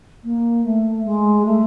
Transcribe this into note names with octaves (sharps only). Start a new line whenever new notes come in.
A#3
A3
G#3
A3